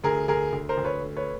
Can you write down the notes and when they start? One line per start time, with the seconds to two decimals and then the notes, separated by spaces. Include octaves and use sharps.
0.04 D2 G#4 A#4
0.28 D2 G#4 A#4
0.52 D2
0.69 A#4 C5
0.77 D2
0.84 B4 C#5
1.01 A3
1.16 B4 C#5